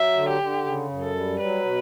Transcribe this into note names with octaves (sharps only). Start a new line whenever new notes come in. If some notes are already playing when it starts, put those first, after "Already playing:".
Already playing: F#3 E5
D3
G4
D3
C#3
F#2
A4
G3
F#3 B4
B2